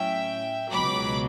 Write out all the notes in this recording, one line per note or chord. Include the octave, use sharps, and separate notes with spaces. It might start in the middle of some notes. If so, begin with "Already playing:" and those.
Already playing: A2 F#3 C#4 E5 G5
C#2 B2 F#3 B5 D6